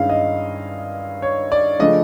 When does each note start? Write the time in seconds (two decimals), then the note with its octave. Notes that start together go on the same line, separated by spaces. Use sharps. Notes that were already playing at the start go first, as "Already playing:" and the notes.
Already playing: G2 D#3 G#3 C#4 E4 F5
0.10 D#5
1.22 C#5
1.52 D5
1.79 C#3 F3 A3 D4 D#5